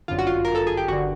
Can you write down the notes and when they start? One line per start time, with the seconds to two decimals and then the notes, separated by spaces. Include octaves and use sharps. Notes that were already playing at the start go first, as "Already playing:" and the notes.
0.08 G1 F#2 D3 F4
0.18 F#4
0.27 F4
0.45 A#4
0.55 A4
0.67 G#4
0.77 G4
0.88 G1 D3 F#4